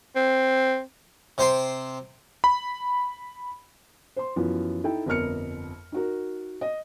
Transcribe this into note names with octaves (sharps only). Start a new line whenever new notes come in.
C4
C3 C5 G5 C6
B5
C5 C6
F#2 E3 F3 B3
D#4 E4 A4 G5
G1 F2 A#4 F6 C#7
D#4 F#4 A#4
D#5